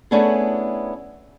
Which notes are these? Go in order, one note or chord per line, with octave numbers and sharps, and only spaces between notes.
A3 B3 C#4 D4 E4 G#4